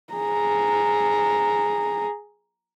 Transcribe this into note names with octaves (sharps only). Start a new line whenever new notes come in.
G#4 A#5